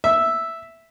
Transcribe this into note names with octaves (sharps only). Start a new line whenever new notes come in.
E5